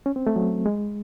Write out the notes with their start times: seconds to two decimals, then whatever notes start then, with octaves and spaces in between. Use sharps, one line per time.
0.06 C#4
0.16 C4
0.27 A3
0.36 F#3
0.66 G#3